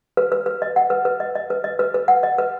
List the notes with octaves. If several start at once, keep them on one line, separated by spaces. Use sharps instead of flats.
B4
B4
B4
D#5
F#5
B4
B4
D#5
D#5
B4
D#5
B4
B4
F#5
D#5
B4